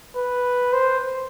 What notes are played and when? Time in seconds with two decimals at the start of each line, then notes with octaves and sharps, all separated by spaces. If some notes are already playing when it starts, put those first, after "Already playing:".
0.16 B4
0.73 C5